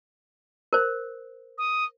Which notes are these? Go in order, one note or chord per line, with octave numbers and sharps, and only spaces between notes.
A#4 C5
D#6